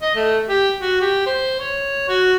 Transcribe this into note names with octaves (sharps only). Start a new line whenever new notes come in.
D#5
A3
G4
F#4
G4
C5
C#5
F#4